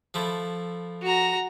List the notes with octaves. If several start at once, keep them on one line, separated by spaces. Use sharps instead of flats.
F3 A3 E4
F#4 A#5